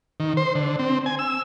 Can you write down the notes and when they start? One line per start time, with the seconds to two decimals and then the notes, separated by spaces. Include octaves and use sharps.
0.20 D#3
0.37 C5
0.55 D3
0.79 C4
1.06 G#5
1.19 E6